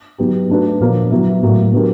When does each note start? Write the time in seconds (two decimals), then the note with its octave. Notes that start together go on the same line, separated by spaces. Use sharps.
0.18 F#3 B3 D#4 G4
0.49 A3 D4 F#4 B4
0.80 A#2 F3 A#3
1.11 F#3 B3 E4
1.42 A2 F#3 A#3
1.73 F#3 B3 D4 G4 A#4